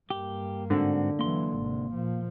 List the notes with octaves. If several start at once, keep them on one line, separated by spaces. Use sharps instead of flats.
G2 A#3 G4
G#2 D3 C4 F#4
E3 F#3 A#3 C6
G#1 C3
A#2 F3